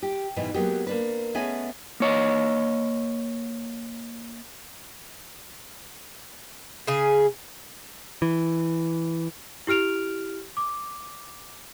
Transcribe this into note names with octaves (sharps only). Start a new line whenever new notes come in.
G4
G#2 B2 E3
F#3 G#3 A#3 B3 G4
A#3 D4 B4
A3 B3 C#4 G#4 D#5 G#5
A#3 C#5 D#5
C#3 G#4
E3
E4 G4 F6 D7 F7
D6